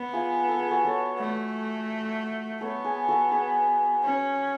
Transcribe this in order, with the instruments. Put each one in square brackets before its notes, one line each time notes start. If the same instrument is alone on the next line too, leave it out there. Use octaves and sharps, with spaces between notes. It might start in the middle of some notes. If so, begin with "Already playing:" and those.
Already playing: [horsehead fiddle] B3
[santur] F4 G#4
A4
G#4
F#4 A4
A4 C#5
[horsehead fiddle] A3 [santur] B4 D5
[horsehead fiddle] B3 [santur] A4 C#5
[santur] G#4 B4
F#4 A4
G#4 B4
[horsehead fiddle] C#4